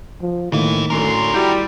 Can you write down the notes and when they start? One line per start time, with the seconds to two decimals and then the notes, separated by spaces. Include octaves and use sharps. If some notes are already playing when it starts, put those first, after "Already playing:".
0.22 F3
0.52 E2 A2 D#3 E3 A#3
0.90 F#2 A2 D3 E3 A#4 C6
1.34 G3 E4 F#4